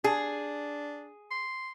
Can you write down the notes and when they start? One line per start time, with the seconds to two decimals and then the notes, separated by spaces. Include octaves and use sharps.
0.04 D4 G#4
1.31 C6